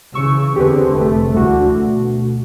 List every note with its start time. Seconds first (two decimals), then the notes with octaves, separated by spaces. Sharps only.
0.14 C#3 E3 C#6 E6
0.56 E2 D3 C4 G4 G#4 B4
0.94 F1 A3
1.34 D2 D3 E3 A3 F#4
1.77 B2